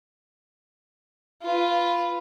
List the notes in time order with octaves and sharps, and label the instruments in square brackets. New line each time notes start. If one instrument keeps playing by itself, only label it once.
[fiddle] F4 B4